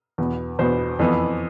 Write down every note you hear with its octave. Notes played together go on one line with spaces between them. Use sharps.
E2 B2 B3
E2 B2 B3 C5
F2 E3 B3